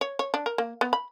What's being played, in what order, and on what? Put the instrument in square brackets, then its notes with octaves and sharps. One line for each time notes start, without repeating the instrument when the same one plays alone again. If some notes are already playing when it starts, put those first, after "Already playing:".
[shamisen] C#5
C#5
D4
A#4
A#3
B3
B5